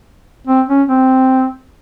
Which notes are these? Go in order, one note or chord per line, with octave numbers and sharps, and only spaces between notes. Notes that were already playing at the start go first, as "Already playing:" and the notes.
C4
C#4
C4